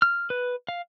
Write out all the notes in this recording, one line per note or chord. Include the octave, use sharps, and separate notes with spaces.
F6
B4
F5